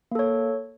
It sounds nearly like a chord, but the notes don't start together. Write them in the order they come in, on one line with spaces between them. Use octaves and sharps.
A#3 A4 C#5